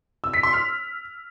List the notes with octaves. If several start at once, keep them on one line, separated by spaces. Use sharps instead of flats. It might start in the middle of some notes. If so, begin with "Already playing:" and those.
E6
B6
C6
F6